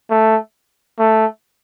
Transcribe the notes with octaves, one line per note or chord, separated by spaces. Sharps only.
A3
A3